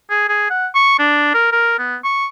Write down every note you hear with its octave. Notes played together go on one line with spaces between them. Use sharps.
G#4
G#4
F#5
C#6
D4
A#4
A#4
B3
C#6